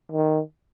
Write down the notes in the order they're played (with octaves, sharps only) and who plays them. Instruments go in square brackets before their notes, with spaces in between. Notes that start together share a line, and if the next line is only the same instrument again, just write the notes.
[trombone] D#3